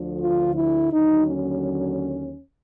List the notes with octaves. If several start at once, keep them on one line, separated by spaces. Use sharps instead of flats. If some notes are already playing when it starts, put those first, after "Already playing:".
Already playing: D2 D3 F3
F4
E4
D#2 D3 F#3 D#4
C#4